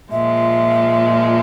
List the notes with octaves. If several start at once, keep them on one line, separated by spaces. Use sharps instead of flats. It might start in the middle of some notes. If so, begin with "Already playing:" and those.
A#2 F3 G#3 E5